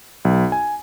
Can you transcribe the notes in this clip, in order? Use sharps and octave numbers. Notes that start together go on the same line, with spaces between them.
B1
G#5